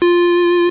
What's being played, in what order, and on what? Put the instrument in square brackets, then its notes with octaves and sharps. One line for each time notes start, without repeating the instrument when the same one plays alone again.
[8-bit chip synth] F4